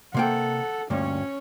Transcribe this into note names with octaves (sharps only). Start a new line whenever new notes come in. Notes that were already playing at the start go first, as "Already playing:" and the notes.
C3 A#3 A4 F#5 G5
D2 G2 A#2 C#4 C#5